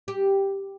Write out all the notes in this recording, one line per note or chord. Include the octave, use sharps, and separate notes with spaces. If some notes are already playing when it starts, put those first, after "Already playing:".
G4